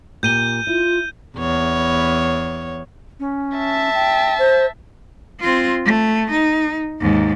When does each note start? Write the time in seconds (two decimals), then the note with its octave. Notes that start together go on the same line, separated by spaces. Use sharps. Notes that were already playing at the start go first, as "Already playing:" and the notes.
0.23 A#2 G4 G6 D#7 G7
0.67 E4 F4
1.38 E2 C#5
3.19 C#4
3.58 E5 A5
3.94 G5
4.38 C5
5.40 C4 F4
5.85 A3
6.31 D#4
7.00 D#2 G#2